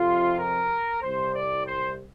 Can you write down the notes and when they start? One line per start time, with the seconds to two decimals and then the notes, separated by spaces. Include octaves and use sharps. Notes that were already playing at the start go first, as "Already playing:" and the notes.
Already playing: F2 C3 F4
0.39 A#4
1.03 C2 C3 C5
1.34 D5
1.66 C5